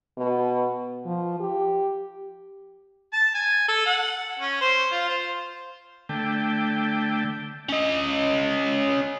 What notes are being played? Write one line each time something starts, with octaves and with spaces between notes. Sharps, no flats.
B2
F3
G4
A5
G#5
A4
F#5
C#4
C5
F4
C5
D3 A3 G5
C#4 D#5